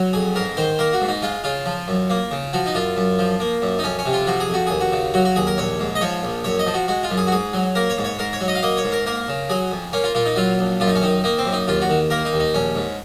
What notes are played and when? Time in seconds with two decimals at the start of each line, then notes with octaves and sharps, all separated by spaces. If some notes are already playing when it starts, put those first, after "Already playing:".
Already playing: F#3
0.13 F2 G#4
0.35 G#2 A#4
0.57 D#3 C5
0.79 A#3 A#4
0.93 F#4
1.01 G#2
1.08 D#4
1.22 G#3 F4
1.44 C#3 F4
1.66 F3
1.88 F#2
2.10 A#3
2.31 C#3
2.53 F3 F#4
2.66 D#4
2.75 F#2 F4
2.97 F#2
3.19 F3
3.40 A#3
3.62 F#2
3.79 D#4
3.84 F2 C#4
3.99 C#4
4.06 C3
4.13 F4
4.27 F3 F#4
4.40 G#4
4.49 F2
4.54 F#4
4.67 D#2 G#4
4.81 F#4
4.93 C#3
5.14 F#3 F#4
5.25 F#4
5.36 D#2 G#4
5.47 A#4
5.58 A#1 C#5
5.80 G#2
5.95 D#5
6.01 F3 C#5
6.23 A#1
6.44 F#2 C#5
6.59 D#5
6.67 F3
6.74 F#4
6.88 G#3 F#4
7.03 F4
7.11 F#2
7.17 G#4
7.27 F#4
7.32 G#2 G#4
7.54 F#3
7.75 A#3 A#4
7.90 C#5
7.98 G#2
8.04 C#5
8.19 G#2 A#4
8.33 C#5
8.41 F#3
8.48 D#5
8.55 F5
8.63 A#3 D#5
8.77 C#5
8.84 G#2
8.92 A#4
9.06 A#3 A#4
9.28 C#3
9.49 F#3 G#4
9.72 F2
9.93 A#3 C#4
10.04 F4
10.15 A#2 F4
10.26 D#4
10.36 F#3 F4
10.59 A#1
10.80 F#2 F4
10.88 D#4
10.96 C#4
11.02 D#3 D#4
11.24 A#3 D#4
11.38 C4
11.46 F#2
11.53 D#4
11.68 D#2 F4
11.82 F#4
11.89 D#3
12.10 A#3 A#4
12.25 D#4
12.33 D#2
12.40 D#4
12.54 A#1 C#4
12.76 G#2